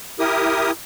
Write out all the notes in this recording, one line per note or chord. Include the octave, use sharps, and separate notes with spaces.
E4 G4 A#4 D#6